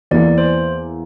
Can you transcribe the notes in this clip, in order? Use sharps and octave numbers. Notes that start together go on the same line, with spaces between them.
E2 E3 A#3 E4 D5
C5